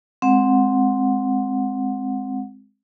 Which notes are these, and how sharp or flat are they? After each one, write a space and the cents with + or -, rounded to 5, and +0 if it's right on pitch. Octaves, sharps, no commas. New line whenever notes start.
G#3 +0 C4 +0 F#5 -15